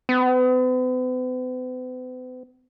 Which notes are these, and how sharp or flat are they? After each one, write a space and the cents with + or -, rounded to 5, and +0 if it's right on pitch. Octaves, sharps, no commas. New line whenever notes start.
B3 +45